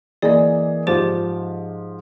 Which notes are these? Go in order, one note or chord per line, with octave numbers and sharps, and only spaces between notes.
E3 A#3 G#4 D5 D#5
G#2 F3 G4 C5 A6